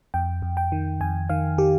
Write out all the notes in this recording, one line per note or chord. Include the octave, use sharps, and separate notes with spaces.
F2 G5
F2
G5
D#3
F2 G#5
D#3 F5
D#3 G4